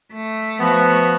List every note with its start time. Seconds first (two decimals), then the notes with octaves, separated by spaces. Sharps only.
0.13 A3
0.60 F3 B3 F#4